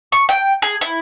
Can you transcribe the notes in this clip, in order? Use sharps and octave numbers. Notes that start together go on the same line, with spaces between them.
C#6
G5
G#4
E4